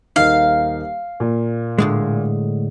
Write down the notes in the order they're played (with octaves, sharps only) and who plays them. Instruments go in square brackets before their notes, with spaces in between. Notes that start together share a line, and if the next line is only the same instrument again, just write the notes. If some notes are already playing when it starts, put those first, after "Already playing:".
[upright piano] D#1 A#3 D#4 [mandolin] F5
[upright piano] A#2
[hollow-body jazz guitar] A2 D3 G#3